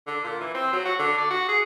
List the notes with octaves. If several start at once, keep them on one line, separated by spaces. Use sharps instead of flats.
D3
A#2
E3
C4
F#3
F#4
D3
D5
F#4
G#4